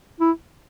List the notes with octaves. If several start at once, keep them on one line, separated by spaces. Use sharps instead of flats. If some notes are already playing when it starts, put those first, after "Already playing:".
E4